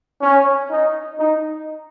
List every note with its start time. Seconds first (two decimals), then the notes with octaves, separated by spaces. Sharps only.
0.22 C#4
0.70 D#4
1.19 D#4